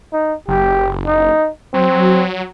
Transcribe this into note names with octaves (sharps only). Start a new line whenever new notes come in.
D#4
F#1 G4
D#4
F#3 C4